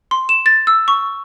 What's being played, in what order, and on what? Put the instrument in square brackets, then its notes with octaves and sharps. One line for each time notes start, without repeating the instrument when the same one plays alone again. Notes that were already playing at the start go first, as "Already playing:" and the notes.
[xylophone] C6
E7
A6
E6
C#6